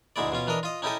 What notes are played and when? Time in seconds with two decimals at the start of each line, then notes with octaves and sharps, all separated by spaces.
0.16 D2 G#2 G#3 E4 D5
0.32 B2 C#4 F4
0.47 E3 D4 A#4 D#5
0.63 F4 D#5
0.82 C#4 D#4 E4 G4 A4 D#5